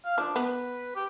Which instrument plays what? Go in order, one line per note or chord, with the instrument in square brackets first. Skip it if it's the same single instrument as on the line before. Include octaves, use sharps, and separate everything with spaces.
[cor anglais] F5
[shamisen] F3 [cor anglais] D4
[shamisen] B3 [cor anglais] B4
[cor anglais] G4